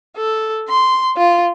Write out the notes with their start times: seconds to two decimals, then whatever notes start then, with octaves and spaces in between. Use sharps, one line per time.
0.17 A4
0.69 C6
1.17 F4